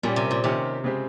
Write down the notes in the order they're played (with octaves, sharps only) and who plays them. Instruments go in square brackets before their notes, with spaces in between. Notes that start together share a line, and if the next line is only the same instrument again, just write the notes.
[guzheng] A#2 [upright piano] G3 C#4 G4
[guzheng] C3
A#2
[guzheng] C3 [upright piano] D#3 A#3 C#4 G4
[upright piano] C#3 G#3 C4 G4